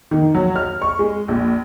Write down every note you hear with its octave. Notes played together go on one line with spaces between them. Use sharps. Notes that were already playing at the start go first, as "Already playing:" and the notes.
D#3
F#3
F6
C#6
G#3
A#1